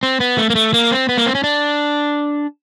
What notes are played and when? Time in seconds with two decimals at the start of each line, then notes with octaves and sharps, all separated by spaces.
0.03 C4
0.20 B3
0.38 A3
0.50 A#3
0.55 A3
0.74 A#3
0.91 C4
1.09 B3
1.17 A#3
1.26 C4
1.35 C#4
1.44 D4